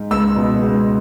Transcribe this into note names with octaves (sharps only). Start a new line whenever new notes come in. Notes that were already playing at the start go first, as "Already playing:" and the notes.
Already playing: G#2
C#2 E6
B2
C#2